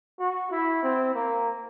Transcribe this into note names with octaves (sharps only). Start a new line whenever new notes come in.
F#4
E4
C4
A#3